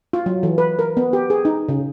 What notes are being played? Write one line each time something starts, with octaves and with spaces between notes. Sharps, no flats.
F4
F#3
E3
B4
A#4
B3
G4
G#4
D#4
C#3